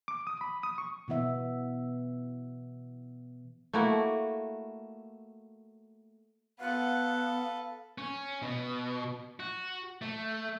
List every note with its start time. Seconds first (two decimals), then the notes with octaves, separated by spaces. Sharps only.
0.08 D6
0.27 D#6
0.41 B5
0.63 D#6
0.78 C#6
1.08 B2 E3 B3 E5
3.74 A3 A#3 E4 F#4
6.60 B3 A4 B4 F5 F#5
7.98 C#4
8.42 B2
9.40 F#4
10.02 A3